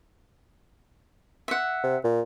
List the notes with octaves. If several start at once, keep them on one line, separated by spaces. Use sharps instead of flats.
E5 F#5
C3
A#2